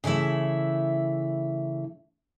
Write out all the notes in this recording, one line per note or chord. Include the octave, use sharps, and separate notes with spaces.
C#3 E3 A3 E4 E5